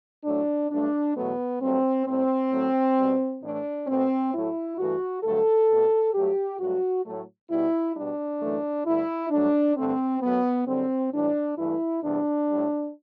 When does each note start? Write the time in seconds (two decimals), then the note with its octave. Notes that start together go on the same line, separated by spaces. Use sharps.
0.25 A2 F#3 A3 D4
0.70 G2 F#3 A3 D4
1.16 E2 B2 F#3 A3 B3
1.61 G2 F#3 A3 C4
2.06 A2 G3 C4
2.51 A2 F#3 A3
2.97 B2 G3
3.42 A2 E3 A3 D4
3.87 B2 A3 C4
4.33 A2 F#3 A3 E4
4.78 G2 E3 A3 F#4
5.23 G2 D3 F#3 A3 A4
5.69 B2 A3
6.14 G2 F#3 A3 G4
6.59 G2 F#3 A3 F#4
7.05 A2 F#3 A3
7.49 B2 G3 E4
7.95 B2 G3 D4
8.40 F#2 E3 A3
8.86 G2 D3 A3 E4
9.31 G2 F#3 A3 D4
9.76 G2 D3 A3 C4
10.21 F#2 F#3 A3 B3
10.67 F#2 D3 G3 C4
11.12 A2 E3 G3 D4
11.57 G2 E3 A3 E4
12.02 E2 C3 G3 D4
12.47 A2 G3